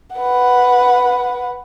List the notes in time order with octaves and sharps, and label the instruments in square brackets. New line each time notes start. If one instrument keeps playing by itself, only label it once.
[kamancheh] B4 F#5